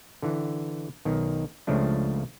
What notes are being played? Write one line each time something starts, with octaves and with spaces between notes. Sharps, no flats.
D3 E3
B1 D#3
C#2 C#3 F3 A3 D4